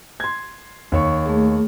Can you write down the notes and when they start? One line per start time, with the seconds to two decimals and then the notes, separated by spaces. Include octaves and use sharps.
0.20 C6 G#6
0.92 D#2 C#5 C#6
1.26 A3 G#4